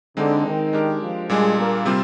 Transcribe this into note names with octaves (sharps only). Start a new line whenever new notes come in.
D3 G#3 C4 D#4
D#3
G#3 D4 G4 A#4
F3
A#2 G3 G#3 D4 G#4
A#3
C3 G3 C4 F4